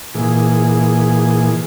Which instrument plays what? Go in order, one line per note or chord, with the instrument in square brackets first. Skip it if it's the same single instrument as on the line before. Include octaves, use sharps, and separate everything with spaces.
[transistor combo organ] A#2 E3 G#4